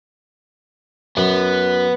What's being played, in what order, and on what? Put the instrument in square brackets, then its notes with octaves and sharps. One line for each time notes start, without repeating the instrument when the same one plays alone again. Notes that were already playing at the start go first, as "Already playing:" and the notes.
[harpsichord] F#2 [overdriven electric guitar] B3